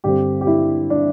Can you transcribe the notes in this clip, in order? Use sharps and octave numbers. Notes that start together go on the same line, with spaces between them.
G2 D3 C4 G4
G4
E4
D4